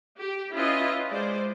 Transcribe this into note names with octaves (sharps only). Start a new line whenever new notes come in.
G4
C#4 E4 F4 B4 D#5
G#3 C5 D5